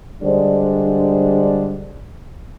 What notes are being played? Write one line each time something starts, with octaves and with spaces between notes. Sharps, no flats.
D3 G3 G#3 D4 C5